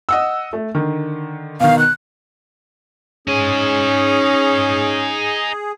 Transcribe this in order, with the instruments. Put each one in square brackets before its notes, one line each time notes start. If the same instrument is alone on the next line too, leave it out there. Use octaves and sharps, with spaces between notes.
[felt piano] D#5 F#5 E6
A3
D3 D#3
[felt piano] B2 D#3 [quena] F5
[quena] F#6
[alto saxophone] C#4 [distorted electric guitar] D#4 G#5 [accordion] G#4